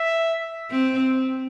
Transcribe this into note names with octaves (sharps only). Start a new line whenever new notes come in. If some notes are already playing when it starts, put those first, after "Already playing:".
Already playing: E5
C4